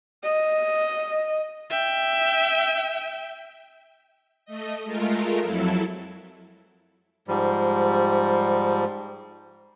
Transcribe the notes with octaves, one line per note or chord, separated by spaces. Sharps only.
D#5
E5 G5
A3 D#5
G#3 A3 F4 A#4
F2 F#3 E4 A4
G#2 F3 G3